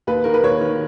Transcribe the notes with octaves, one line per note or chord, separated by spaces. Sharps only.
D#2 B4
D#3 A#4
B4
D#2 C#5
D#3